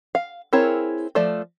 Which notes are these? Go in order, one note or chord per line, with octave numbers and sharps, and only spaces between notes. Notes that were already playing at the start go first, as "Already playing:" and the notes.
F5
C4 E4 G#4 A#4 C#5
F3 A3 D5